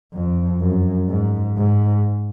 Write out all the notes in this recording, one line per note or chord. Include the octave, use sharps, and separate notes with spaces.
F2
F#2
G#2
G#2